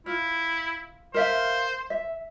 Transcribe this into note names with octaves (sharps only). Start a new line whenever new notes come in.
E4 F4
A#4 C5 E5 F5
E5